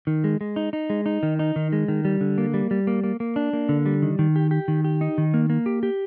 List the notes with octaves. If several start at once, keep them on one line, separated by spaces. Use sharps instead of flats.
D#3
G#3
G#3
D#4
D#4
G#3
D#4
D#3
D#4
D#3
G#3
D#3
G3
D3
A#3
G3
G3
A#3
A#3
A#3
D4
A#3
D3
G3
D#3
D#3
G4
G4
D#3
G4
D#4
D#3
A#3
A#3
G4
G4